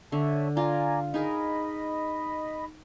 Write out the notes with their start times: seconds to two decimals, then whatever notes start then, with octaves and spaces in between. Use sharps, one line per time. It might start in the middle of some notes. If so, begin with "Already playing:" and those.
0.12 D3 C#5 E5 A5
0.57 F4 D5 G#5 A#5
1.14 D#4 G#4 A#4 D#5 B5